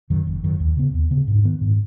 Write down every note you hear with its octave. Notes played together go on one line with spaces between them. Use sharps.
F#2 D#3 F#3
F#1
F#2 D#3 F#3
D#2
C#3 B3
D#2
C#3 B3
G#2
D#3 B3
G#2